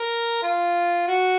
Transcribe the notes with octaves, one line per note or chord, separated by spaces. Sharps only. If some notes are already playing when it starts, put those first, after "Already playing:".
Already playing: A#4
F4
F#4